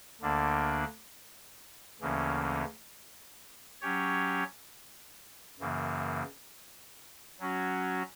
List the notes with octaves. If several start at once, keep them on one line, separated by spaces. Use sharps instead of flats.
D2 D3 A#3 D4
D2 C#3 E3 A#3 C#4
F#3 C#4 G4 C#5
F#2 C#3 E3 A#3
F#3 C#4 F#4